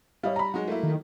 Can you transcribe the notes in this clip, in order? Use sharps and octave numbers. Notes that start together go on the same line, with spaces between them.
G3 C#5 D#5 F5
A#5 B5
F#3 G#3 D#4 F#4
A3 A#3 E4
D#3